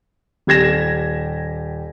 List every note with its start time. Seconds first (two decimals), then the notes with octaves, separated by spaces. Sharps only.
0.47 D#1 G4 G#6 A#6 E7